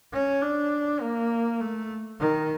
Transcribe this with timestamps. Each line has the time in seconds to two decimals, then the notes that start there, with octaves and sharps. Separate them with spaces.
0.13 C#4
0.42 D4
1.01 A#3
1.60 A3
2.20 D#3